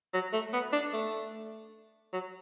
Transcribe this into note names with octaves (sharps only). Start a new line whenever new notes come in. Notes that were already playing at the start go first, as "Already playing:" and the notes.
F#3
A3
B3
D4
A3
F#3